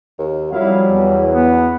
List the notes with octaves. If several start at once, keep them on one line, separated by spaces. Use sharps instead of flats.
D#2
F2 F#3 G3 E4 F5
E2
B3